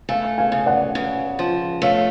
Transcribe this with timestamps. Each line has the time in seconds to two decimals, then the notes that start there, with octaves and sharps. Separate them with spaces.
0.09 A3 F5 G#5
0.38 F5 G#5
0.52 C#3
0.66 D5 F#5
0.95 C#3
1.39 F3
1.82 A3 C#5 F5